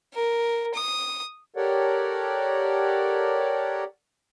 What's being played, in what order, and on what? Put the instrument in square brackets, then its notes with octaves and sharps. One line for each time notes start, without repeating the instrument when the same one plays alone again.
[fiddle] A#4
D#6
[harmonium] G4 A4 A#4 C#5 D5 F#5